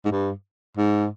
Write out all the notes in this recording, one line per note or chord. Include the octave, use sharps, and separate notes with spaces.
G#2
G2
G#2